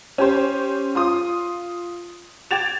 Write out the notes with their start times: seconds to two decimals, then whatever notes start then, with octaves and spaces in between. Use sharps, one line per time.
0.18 C#4 G4 C5
0.95 F4 C6 D#6
2.51 G5 D6 G#6 A6 E7 F7